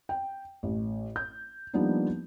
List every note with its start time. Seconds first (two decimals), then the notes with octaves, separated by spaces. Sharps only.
0.09 G5
0.63 A1
1.16 G6
1.74 F3 G3 A#3 B3 D4 D#4